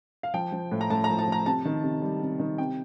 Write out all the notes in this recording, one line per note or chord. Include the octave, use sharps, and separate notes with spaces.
F5
F3 G5
F3
A2
A#5
A2 A5
A#5
F3
A5
F3 A#5
C3 A5
D#3
C3
G3
C3
D#3
C3 G5